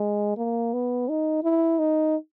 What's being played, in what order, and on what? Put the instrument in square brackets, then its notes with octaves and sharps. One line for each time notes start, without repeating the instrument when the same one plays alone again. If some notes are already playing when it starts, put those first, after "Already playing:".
Already playing: [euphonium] G#3
A#3
B3
D#4
E4
D#4